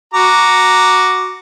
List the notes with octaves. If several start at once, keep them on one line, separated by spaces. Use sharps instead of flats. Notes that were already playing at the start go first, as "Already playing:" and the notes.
F#4 A#5 D6